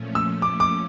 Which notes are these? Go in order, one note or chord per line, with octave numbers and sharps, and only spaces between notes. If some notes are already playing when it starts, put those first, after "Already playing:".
Already playing: A#2 F3 A3 C#4
E6
D6
D6